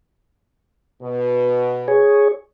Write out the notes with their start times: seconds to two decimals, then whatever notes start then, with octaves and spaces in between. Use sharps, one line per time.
1.02 B2
1.88 G#4 C#5